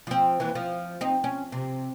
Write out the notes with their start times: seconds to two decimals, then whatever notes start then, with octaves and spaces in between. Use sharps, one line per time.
0.07 F3 C4
0.40 D#2 E3
0.55 F3
1.01 C4 D#4
1.24 C#4
1.52 C3